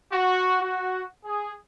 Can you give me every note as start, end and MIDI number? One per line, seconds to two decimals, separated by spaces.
0.12 0.57 66
0.61 1.03 66
1.25 1.52 68